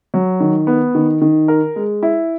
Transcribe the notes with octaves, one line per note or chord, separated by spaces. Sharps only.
F#3
D#3
B3
D#3
D#3
A#4
G#3
E4